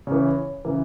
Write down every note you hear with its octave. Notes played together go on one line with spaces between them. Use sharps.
C#3 E3 C#5
C#3 E3